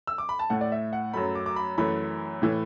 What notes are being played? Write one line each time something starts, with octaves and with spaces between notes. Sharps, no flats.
E6
D6
B5
A5
A2 A3 F#5
D5
E5
F#5
F#2 F#3 A3 B5
D6
D6
B5
F#2 E3 A3 B5
A2 E3 A3